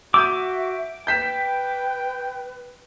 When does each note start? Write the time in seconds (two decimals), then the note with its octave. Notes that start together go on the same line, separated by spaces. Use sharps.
0.14 F#4 E5 D6 E6 G6 D#7
1.07 B4 G5 G6 B6 E7